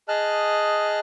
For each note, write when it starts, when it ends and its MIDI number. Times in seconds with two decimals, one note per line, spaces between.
0.08 1.00 68
0.08 1.00 75
0.08 1.00 81
0.08 1.00 89
0.08 1.00 90